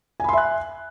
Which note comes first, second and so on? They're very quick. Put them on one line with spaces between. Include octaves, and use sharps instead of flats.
G#5 B5 C6 E5 F#6